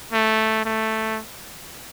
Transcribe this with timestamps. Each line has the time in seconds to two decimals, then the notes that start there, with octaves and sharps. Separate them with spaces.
0.13 A3
0.65 A3